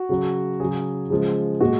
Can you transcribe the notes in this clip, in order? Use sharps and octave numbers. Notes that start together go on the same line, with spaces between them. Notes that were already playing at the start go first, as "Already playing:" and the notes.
Already playing: F#4
C#3 F#3
C#3 F#3 G#4
C#3 F3 G#3
A#2 G#3 F#4